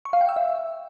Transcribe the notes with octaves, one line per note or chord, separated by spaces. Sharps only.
C#6
F5
G5
E6
E5